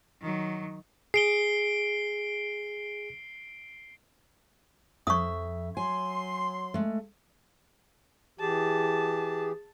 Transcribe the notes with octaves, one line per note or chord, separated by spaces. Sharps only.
D#3 F#3
G#4 C7 D7 G7
F2 E5 C#6 D#6
F#3 G#5 C6
G#3 A3
E3 G4 G#4 A5